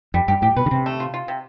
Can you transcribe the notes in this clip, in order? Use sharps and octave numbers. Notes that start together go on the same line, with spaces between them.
F2 G3
G2 G4
A2 G4
B2 B4
D3
C3 C4
A3
F4
F4
C3